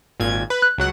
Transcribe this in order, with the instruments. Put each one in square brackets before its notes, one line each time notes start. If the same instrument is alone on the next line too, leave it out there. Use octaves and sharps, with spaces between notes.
[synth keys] G#1 A#2 G#6
B4
[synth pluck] F#6
[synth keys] C#2 F#3 F#5